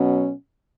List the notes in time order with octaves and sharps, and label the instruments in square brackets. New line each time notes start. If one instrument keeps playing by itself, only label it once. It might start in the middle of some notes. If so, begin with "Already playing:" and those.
Already playing: [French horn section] B2 F#3 C#4